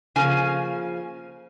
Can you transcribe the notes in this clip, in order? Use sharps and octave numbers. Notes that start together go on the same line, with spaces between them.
C#3 F3 A#3 G#5